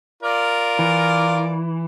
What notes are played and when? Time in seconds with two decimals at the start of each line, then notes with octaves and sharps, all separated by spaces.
0.23 F4 A#4 D5
0.79 E3